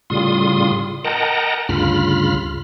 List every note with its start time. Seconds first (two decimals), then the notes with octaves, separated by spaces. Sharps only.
0.10 A2 C#3 G3 F4 C6 D#6
1.04 A#4 D#5 F#5 G5 A5 A#5
1.69 D2 G2 C#3 F4 B5 F6